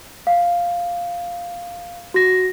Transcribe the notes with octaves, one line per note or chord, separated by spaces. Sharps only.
F5
F#4 A#6